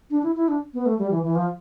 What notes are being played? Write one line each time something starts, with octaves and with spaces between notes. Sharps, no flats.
D4
E4
E4
D4
B3
A3
G3
E3
E3
F3